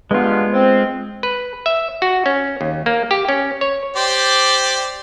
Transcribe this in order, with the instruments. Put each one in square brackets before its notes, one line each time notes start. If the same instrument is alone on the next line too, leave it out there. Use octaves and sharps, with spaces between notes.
[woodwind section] G2 B3 [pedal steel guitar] G#3 F4
[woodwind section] C4
[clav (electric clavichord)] B4
E5
F#4
C#4
D#2
A#3
G4
C#4
C#5
[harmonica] G4 C5 D5